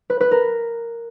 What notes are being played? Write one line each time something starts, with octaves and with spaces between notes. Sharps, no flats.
B4
B4
A#4